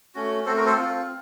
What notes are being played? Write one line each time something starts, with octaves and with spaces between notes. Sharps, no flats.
A3 C#4 F#4
A3 C4 F#4 A4 C5
F#4 A#4
A4 C5
C4 F4